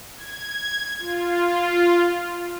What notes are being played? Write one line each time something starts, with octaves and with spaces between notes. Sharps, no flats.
G#6
F4